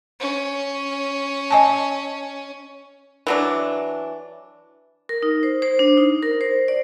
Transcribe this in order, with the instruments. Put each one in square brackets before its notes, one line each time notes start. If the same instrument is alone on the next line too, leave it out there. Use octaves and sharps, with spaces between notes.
[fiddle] C#4
[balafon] D#5 G#5 A5
[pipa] E3 F#3 D4
[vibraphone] A#4
D#4
C5
C5
D4
D#4
A#4
C5
D5